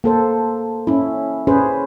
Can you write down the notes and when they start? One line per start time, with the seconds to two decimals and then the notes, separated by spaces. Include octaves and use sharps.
0.04 A#3 A4 C5
0.87 C#4 E4
1.47 C#4 G#4 B4 C5